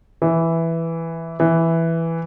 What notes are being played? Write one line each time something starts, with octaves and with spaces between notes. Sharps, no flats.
E3
E3